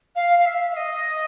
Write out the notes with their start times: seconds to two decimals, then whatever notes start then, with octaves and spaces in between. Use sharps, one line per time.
0.15 F5
0.39 F5
0.45 E5
0.71 E5
0.76 D#5